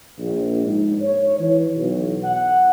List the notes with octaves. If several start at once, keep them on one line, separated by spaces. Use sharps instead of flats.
A#1
G#2
C#5
E3
B1
F#5